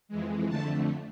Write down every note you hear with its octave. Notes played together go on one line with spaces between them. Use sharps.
F2 E3 G#3
F2 D3 A3 A5